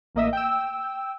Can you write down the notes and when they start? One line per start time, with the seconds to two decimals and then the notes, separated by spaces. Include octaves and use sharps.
0.15 A1 A#3 D#5 E5
0.33 G5 E6